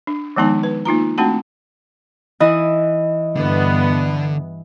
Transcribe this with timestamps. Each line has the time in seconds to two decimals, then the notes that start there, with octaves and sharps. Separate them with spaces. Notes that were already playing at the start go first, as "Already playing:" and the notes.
0.07 D4
0.36 D#3 F3 G#3 B3 D#4 G#5
0.63 B4
0.85 A#3 D#4 F4 A#5
1.18 A3 C4 D4 F#4 F#5 A5
2.40 E3 E4 D#5
3.36 G2 D3 B3